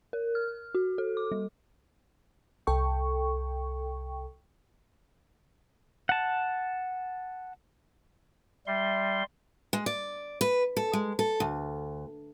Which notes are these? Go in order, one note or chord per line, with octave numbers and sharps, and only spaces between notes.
A#4
F6
F#4
A4
D6
G3
C2 A4 G5 C#6
F#5 A5
G3 E5 C6
G#3
D5
B4
A4
G#3
A4
D2